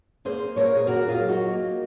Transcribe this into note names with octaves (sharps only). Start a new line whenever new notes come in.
A#3 G#4 C5
A#2 A#4 C#5
G#4
A#2 F#4 A#4
F4 G#4
F#3
D#4 F#4
A#3